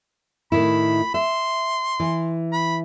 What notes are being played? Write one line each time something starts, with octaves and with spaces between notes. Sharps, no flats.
A2 D#3 E4 B5
E5 C6
E3
B5